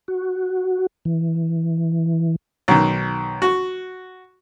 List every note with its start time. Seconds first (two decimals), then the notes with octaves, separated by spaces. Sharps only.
0.08 F#4
1.05 E3
2.68 B1 D#3
3.42 F#4